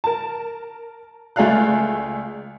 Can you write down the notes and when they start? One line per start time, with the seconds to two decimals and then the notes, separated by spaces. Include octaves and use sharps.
0.04 A#4 A5
1.36 C#2 A3 G#4 D5 F5 F#6